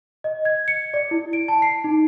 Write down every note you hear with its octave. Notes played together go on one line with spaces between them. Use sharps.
D#5
G#6
C#7
D5
E4
D7
A5
C7
D#4